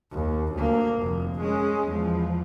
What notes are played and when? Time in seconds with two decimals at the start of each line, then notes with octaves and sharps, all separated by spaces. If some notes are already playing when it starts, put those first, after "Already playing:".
0.11 D#2
0.53 D2 A#3
0.98 F1
1.41 G#3 C#4
1.88 E2 F3